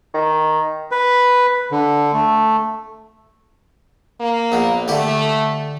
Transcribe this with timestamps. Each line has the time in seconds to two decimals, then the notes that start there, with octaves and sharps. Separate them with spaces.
0.14 D#3
0.92 B4
1.72 D3
2.13 A3
4.20 A#3
4.52 A#1 B3
4.88 D3 A3 E4 G4